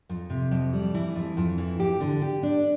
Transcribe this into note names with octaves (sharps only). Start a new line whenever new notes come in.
F2
C3
F2
G3
E3
F2
F2
E3
G4
D3
G4
D4